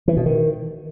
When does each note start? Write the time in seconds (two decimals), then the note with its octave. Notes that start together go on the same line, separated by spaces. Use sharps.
0.08 E3
0.17 B2
0.26 D#3